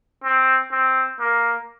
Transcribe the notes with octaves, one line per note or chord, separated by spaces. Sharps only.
C4
C4
A#3